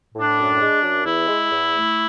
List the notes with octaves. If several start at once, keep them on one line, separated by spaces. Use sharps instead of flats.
A2
D4
F#2
G#3
F#2
E2 E4
G#3
E2
A3